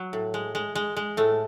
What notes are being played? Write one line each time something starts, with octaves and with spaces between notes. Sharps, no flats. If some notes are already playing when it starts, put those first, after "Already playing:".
Already playing: F#3
A2
G#3
G#3
G#3
G#3
A2 A3